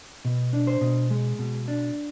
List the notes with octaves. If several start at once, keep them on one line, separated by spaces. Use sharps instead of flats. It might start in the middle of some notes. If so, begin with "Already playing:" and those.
B2
D4
C5
B2
G#3
B2
D4